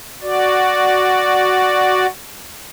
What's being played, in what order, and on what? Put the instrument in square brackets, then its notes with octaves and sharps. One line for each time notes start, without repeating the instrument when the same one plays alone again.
[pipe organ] F#4 D5